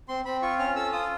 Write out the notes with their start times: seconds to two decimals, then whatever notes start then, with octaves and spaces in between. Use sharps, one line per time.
0.08 C4 C6
0.25 C4 B5
0.42 F4 C#6
0.59 C#4 F6
0.76 A4 E6
0.92 F4 D#6